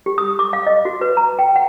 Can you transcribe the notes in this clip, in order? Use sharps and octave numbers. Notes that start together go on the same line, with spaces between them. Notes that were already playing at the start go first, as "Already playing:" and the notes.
G4
D#6
D6
F5
D#5
F#4
B4
A#5
G5
F#5